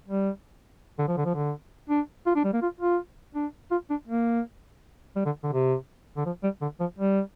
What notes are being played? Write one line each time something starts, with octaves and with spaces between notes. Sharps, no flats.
G3
D3
F3
D3
F3
D3
D4
F4
D4
G3
A#3
F4
F4
D4
F4
D4
A#3
G3
D3
D3
C3
D3
F3
G3
D3
F3
G3